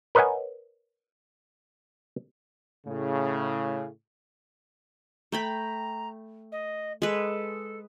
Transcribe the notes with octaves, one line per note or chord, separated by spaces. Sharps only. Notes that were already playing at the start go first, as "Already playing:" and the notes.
A#4 B4 C#5 D#5 F#5 G#5
A2 C#3
A3 G5 A#5 B5
D#5
G#3 A4 B4